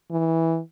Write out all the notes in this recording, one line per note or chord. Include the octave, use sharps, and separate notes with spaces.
E3